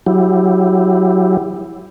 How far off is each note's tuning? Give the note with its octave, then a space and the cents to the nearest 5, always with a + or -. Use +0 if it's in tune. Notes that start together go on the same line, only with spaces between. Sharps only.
F#3 +0 E4 +0 G4 +15